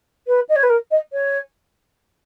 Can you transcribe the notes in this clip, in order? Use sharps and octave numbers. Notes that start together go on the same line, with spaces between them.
B4
D#5
C#5
B4
A#4
D#5
C#5